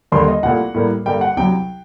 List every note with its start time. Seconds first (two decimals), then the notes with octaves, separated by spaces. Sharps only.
0.12 D#2 D3 G3 A#3 C6
0.28 D#5
0.43 C2 A#2 A3 F#5
0.74 A2 G3 A#3
1.06 G2 D3 G3 A#3 G5
1.21 F#5
1.37 C2 C3 F#3 G5